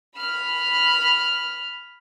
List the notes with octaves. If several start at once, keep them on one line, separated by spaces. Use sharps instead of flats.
B5 F6